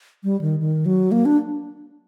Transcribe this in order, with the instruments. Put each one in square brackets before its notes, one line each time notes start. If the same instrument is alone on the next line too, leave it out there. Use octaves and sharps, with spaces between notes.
[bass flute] G3
D#3
D#3
F#3
A#3
D4